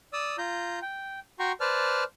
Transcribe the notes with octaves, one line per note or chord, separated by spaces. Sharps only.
D5 D#6 E6
F4 A#5 G6
G5
F#4 G5 A#5 C6 C#6
B4 C5 D5 A5 F6